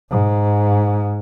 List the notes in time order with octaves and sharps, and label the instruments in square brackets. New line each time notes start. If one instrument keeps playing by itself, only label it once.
[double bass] G#2